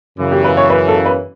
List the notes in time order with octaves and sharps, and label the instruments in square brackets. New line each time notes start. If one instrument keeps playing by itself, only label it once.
[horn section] F#2 C#3 E3
[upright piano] G4
B4
C#5
B4
A4
B4